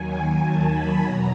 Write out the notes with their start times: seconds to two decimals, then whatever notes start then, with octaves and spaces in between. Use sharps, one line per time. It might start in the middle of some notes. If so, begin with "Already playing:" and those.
Already playing: D#2 D#3 F#3 G#5
0.41 A5
0.71 B5
1.00 E2 B2 F#3 A#5